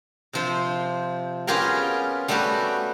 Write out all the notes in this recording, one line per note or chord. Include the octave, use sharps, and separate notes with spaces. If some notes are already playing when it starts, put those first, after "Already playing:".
C3 F3 C5
B3 C#4 F4 G4 G#4 A#4
G3 A3 B3 F#4 G4 B4